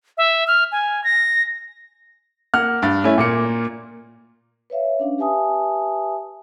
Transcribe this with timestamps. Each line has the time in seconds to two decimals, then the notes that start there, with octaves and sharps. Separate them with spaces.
0.18 E5
0.47 F6
0.72 G#5
1.04 A#6
2.54 A#3 F#5 F6
2.82 G2 A6
3.04 A3 C#4 E4
3.18 A#2 A#3 C#7
4.70 B4 C#5 E5 F5
4.99 C#4 D4 F5
5.18 G4 B4 E5 G#5 A5 D#6